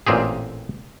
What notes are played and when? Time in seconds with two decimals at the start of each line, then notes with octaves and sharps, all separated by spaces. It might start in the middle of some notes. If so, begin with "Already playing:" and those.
0.07 A1 A#2 C4 G4 G#4